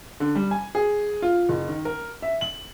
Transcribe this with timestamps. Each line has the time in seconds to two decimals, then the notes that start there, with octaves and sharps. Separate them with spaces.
0.20 D3
0.35 G3
0.51 G#5
0.75 G#4
1.22 F4
1.49 F#1
1.68 D#3
1.85 A#4
2.22 E5
2.41 F#7